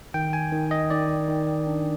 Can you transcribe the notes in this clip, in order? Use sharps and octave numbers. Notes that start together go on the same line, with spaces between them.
D#3 G5
G#5
D#3
D#5
D#3 D5
D#3
D4